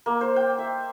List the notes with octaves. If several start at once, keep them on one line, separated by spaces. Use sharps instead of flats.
A#3
C5
G5
E5